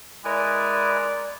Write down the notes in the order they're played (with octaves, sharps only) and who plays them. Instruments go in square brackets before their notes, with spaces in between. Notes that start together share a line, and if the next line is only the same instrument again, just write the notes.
[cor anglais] G#3 [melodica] E4 B4 G#5 [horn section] A#4 D5